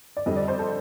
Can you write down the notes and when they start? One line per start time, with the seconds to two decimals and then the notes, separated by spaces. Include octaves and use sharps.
0.17 D5
0.26 F2 D3 G3 D#5
0.37 D5
0.48 C5
0.59 A4